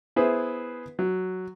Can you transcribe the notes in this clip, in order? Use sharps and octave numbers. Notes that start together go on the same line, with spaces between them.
B3 E4 G#4 B4 C5
F#3